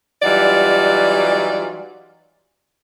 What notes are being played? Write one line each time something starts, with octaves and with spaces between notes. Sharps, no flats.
E3 F#3 G3 D#4 F4 D5